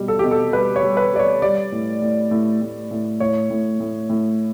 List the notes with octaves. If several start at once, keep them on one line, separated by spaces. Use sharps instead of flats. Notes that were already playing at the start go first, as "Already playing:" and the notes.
Already playing: B2 G3
A4
B2 G4
A4
G3 B4
C#5
G3
B4
G3 D5
C#5
G3 D5
A2
A2
A2
A2
A2
A2 C#5
A2
A2
A2